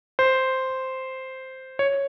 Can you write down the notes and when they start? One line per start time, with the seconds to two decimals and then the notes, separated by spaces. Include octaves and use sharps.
0.19 C5
1.79 C#5